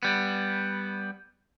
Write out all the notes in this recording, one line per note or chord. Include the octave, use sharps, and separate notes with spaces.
G3 B3